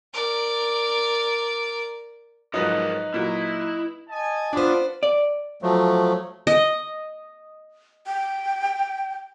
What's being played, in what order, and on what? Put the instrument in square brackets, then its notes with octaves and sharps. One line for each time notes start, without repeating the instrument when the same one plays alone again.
[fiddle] A#4 D5
[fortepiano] G#2 F3 F#3 [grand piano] D#4 B4 [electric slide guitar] A#4 C#5 D#5
[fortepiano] A#2 F#3 [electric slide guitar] E4
[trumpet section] D#5 G#5 A5
[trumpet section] B3 [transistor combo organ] D4 [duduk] F4 [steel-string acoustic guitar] B4 C5
[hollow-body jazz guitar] D5
[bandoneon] F3 F#3 A3
[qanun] D#5
[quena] G5